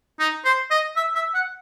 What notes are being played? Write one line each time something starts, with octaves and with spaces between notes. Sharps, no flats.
D#4
C5
D#5
E5
E5
F#5